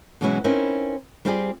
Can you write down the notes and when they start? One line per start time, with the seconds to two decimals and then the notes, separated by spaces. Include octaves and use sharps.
0.21 B2 E3 F#3 G#3 C#4 E4
0.44 C4 C#4 D#4 E4 A#4 B4
1.25 G3 C4 F4 G4 G#4 D5